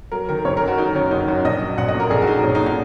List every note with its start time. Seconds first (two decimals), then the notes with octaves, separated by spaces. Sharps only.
0.12 F#3 A#4
0.29 D#3 A#4
0.39 A#4
0.45 F#1 C#5
0.57 A#4
0.62 F#2
0.68 F#4
0.78 F#3 D#4
0.94 D#3 C#4
1.11 F#1 D#4
1.28 F#2 F#4
1.45 A#1 D#5
1.61 F#3
1.78 A#1 F#5
1.88 D#5
1.94 A#2
2.00 A#4
2.10 A#1 G#4
2.22 F#4
2.27 F#3 D#4
2.44 A#1 C#4
2.55 D#4
2.61 A#2
2.66 D#4